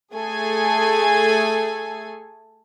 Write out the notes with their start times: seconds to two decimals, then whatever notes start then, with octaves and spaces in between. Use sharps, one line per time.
0.15 A3 G#4 A4 G#5